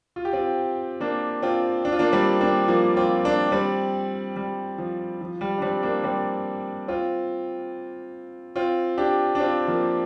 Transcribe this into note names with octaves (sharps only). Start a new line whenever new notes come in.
F4
G4
C4 F4
A#3 D4
C4 F4
D4
F4
A#3 D4
G3 C4
A#3 D4
F3 A#3
C4 F4
A#3 D4
G3 C4
G3
F3
F3
G3
D4
G3 C4
A#3 D4
G3 C4
C4 F4
C4 F4
D4 G4
D4
C4 F4
F3 A#3